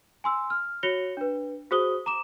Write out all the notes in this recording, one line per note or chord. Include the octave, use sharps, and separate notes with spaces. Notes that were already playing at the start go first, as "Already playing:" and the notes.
G#5 C6 E6
F6
F#4 C#5 A#6 C#7 F7 G7
D4 B4
F#4 G#4 C5 D#6 G7
A#5 D6 E7